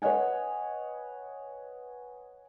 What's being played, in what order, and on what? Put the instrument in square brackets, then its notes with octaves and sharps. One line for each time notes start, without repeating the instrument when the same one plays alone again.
[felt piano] B4 C#5 D#5 F#5 G#5